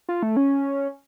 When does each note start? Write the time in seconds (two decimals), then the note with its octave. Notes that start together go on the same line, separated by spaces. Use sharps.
0.09 F4
0.23 A3
0.37 C#4